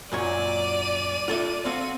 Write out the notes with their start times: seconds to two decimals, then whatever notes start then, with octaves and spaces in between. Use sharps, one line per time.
0.12 F#2 A#2 C#5 D5 D#7
1.28 F4 A4 E5
1.65 C4 F#4 A4 F5 D#7